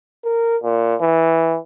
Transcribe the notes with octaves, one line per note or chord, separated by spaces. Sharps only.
A#4
A#2
E3